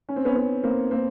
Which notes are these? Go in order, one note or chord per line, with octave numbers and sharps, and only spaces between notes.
C#4
C4
B3 C#4
B3 C#4
A#3 C4
A#3 C4